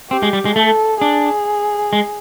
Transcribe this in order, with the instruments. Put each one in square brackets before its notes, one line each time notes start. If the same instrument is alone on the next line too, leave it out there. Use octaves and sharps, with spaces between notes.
[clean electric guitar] C4 [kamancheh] G4
[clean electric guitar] G#3
G3
G#3
[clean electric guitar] A3 [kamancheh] A4
[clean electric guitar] D4 [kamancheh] G#4
[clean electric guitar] G#3